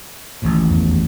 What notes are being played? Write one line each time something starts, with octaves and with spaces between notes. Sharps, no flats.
A1 D#2 A2
E2